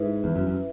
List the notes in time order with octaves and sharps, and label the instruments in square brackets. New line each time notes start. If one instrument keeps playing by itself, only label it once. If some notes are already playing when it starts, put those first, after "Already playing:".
Already playing: [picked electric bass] G#2 [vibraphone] E4 B4 E5
[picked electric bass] E2
F#2
F#2